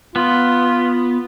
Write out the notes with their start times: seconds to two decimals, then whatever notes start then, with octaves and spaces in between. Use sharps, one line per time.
0.16 B3 F4